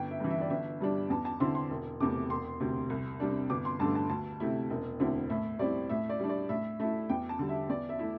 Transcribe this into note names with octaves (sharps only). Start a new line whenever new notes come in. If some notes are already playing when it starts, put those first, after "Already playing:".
Already playing: G1 G5
E5
G2 E3
E5
D5
G1 E5
G2 G3 D4
E2 A5
A5
D3 C4 E4 C6
C6
E1
E2 C3 A3 D6
E1 C6
D2 C3
C2
C3 G3 D4
G1 D6
C6
G2 D3 A3 A5
A5
D2 A5
C3 A3 E4
E1
D2 D3 C4 E4
A2 E5
G3 C4 E4 D5
A2 E5
D5
G3 D4
D5
A2 E5
A3 E4 E5
E2 G5
A5
D3 G3
E5
E2 D5
E5
A3 E4